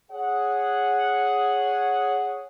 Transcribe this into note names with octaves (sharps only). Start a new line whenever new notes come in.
G#4 C#5 F#5